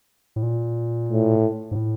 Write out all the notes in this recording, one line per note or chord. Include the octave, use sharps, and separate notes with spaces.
A2
A#2
A2
G#2
A2